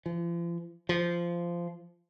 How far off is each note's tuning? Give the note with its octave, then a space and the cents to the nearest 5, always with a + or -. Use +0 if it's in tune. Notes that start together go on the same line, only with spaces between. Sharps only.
F3 -40
F3 -15